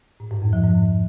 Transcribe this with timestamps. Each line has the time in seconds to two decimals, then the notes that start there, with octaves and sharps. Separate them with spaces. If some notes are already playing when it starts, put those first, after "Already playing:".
0.20 A2
0.31 G#2
0.42 F2
0.53 F3
0.64 G#2